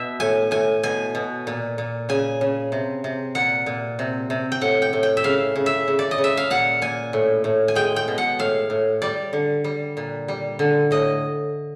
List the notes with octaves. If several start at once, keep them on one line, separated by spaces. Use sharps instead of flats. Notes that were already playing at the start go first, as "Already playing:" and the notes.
Already playing: B2 E5
A2 G#5
A2 G#5
B2 G#5
B2
A#2
A#2
C#3 G#5
C#3
C3
C3
A#2 F#5
A#2
C3
C3
G5
A2 F#5
G5
A2
G5
E5
C#3 F5
C#3
E5
C#3
D5
D#5
C#3
E5
F5
A#2 F#5
A#2 G#5
A2
A2
G#5
G#3 G5
G5
B2
F#5
A2 F5
A2
G3 D5
D3
G3
A#2
G3
D3
A2 D#5